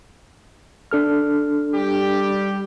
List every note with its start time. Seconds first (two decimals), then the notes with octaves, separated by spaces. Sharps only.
0.91 D4 A4 F6
1.74 G3 G4